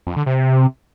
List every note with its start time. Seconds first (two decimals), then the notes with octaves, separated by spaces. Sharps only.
0.07 F2
0.17 D3
0.26 C3